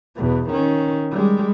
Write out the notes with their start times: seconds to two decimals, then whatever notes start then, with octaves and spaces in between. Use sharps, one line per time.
0.15 E2 B2
0.50 D#3 C#4
1.11 G3 G#3